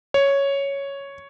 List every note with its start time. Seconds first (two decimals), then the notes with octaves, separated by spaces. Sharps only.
0.14 C#5